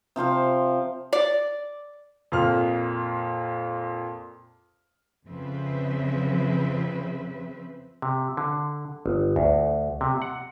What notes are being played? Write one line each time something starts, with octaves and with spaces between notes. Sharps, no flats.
C3 F3 C5 F5
D5
F2 A#2 F6
F2 C#3 F3 C4 B4 E5
C3
D3
G1
D2
C3
F#5